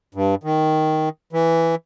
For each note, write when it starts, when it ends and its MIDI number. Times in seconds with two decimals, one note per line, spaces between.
0.15 0.35 43
0.43 1.09 51
1.33 1.75 52